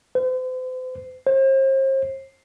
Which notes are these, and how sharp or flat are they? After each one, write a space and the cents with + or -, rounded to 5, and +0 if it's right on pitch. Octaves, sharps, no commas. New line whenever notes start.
C5 -40
C5 +40